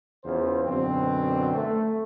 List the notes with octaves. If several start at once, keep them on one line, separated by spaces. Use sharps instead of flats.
E2 C#3 C#4 F4 C5
F#2 B2 D3 C4
A3